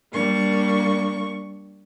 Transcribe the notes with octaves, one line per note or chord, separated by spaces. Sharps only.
G3 A#3 D4 C#6